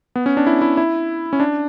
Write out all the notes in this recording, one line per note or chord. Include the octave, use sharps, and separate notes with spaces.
B3
C#4
D4
E4
E4
E4
C#4
D4